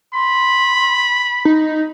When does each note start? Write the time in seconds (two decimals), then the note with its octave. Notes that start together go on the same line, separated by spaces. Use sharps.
0.14 B5 C6
1.45 D#4 D#5